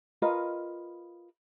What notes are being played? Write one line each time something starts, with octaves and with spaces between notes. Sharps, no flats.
F4 A#4 B4 D#5